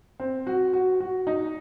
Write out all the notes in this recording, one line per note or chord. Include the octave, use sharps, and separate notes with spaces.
C4
F#4
F#4
F#4
D#4